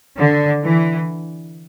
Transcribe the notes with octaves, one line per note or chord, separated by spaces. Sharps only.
D3
E3